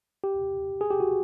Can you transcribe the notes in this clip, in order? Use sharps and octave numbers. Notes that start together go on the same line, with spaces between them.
G4
G#4
G4
F#4